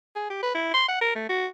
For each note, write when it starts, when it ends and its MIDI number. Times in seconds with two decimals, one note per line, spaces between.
0.15 0.28 68
0.30 0.38 67
0.42 0.52 71
0.54 0.69 64
0.74 0.87 84
0.88 1.00 78
1.01 1.12 70
1.15 1.27 57
1.29 1.46 66